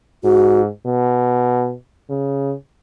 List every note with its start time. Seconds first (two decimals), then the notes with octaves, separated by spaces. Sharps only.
0.24 G#2 F#4
0.86 B2
2.09 C#3